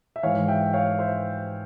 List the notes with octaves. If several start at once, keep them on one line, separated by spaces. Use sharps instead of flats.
E5
G#2 E3 C#5 F5
E5 G5
C#5 F5
C5 E5